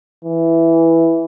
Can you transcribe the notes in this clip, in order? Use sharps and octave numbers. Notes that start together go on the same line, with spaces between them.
E3